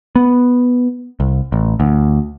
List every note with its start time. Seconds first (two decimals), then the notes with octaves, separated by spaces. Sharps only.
0.16 B3
1.20 C2
1.52 A1
1.80 D2